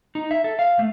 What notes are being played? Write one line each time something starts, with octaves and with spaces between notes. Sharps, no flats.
D#4
E5
A4
F5
A3